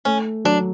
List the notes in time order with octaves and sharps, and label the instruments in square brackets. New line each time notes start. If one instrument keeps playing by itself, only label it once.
[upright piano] A3 [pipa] C#4
[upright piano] F#3 [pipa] D4